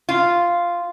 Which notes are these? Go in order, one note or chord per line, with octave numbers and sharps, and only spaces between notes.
F4